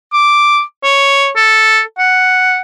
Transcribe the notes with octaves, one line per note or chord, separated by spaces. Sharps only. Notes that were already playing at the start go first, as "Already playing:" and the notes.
D6
C#5
A4
F#5